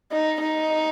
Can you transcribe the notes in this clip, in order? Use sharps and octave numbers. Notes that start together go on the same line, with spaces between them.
D#4
D#4